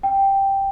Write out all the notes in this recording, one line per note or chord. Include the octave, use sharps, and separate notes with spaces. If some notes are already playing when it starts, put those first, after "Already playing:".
G5